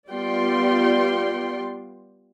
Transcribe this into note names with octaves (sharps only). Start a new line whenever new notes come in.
G3 B3 F4 D5 G5 C6